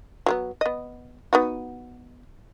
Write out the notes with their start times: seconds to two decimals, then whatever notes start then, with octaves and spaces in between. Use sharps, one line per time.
0.26 F#3 A#3 B3
0.61 B3 D#5
1.33 B3 D#4 F#4